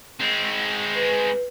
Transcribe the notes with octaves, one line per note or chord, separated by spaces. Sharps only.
G#3 C4
B4